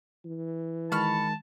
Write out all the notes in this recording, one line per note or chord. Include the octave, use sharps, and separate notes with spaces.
E3
D#3 G#3 A5 B5 C#6 F6